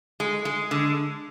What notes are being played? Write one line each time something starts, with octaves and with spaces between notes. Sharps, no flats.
G#3
G#3
D3